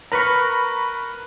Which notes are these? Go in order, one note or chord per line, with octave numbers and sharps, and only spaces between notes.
A#4 B4 A#5 B5 C#6